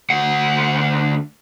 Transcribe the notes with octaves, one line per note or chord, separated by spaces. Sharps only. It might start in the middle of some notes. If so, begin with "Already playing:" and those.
D2 F#5